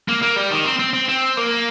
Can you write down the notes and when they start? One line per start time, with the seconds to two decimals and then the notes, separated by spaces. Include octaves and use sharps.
0.08 A#3
0.22 A#3
0.36 G3
0.51 D#3
0.65 C4
0.79 C4
0.93 C4
1.08 C4
1.37 A#3